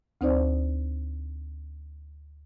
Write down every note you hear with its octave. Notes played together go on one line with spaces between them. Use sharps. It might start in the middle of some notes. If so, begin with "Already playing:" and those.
D2 C4 D#4 C5 D5